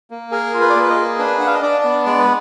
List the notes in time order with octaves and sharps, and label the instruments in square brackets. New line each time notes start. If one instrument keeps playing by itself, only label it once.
[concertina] A#3
G#4 A#4
F4
B4
D5
A#3 B4
D#5
G#4
D4 B4
D4 F#5
F5
D#5
D4 D5
B3
G#3 D5
B4